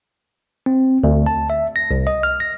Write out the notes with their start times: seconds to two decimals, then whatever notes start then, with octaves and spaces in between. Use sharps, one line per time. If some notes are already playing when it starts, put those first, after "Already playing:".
0.66 C4
1.04 D2
1.26 A5
1.50 E5
1.76 A#6
1.91 C2
2.07 D#5
2.23 F6
2.40 A#6